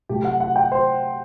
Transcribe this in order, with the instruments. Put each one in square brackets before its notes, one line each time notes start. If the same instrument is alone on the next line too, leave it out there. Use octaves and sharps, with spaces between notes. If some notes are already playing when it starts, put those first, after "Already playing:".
[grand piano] C3 F#3 A3 G4
F#5
F#5
G5
C5